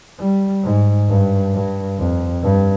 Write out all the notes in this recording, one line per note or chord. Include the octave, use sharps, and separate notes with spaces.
G3
G#2
G2
G2
F2
G2